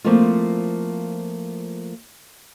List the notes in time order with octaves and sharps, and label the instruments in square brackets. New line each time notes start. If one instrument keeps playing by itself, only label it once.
[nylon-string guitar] F3 A3 A#3 C4 E4 F4